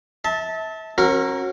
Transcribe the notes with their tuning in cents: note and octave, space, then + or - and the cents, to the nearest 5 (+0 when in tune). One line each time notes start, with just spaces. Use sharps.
E5 -35 A5 +0
C#4 -40 F#4 +0 A#4 +0